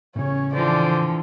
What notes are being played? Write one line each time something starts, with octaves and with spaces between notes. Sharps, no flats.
A2 C#3 C#4 C#5
D3 E3 F3 C5 D5